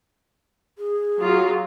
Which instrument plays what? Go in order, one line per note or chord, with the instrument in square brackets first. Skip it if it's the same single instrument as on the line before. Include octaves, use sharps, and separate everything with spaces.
[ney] G#4
[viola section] F#3 F4